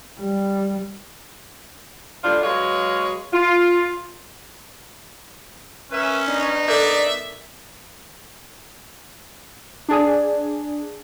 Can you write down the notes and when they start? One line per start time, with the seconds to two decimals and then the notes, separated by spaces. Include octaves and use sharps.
0.18 G3
2.24 D3 G3 D4 F4
2.43 F#3 G#3 B4 C#5 D#5 F5
3.33 F4
5.92 C#4 A#4 B4 E5
6.27 B3 D4 D#4
6.68 A4 A#4 D5 E5
9.89 D4 G#4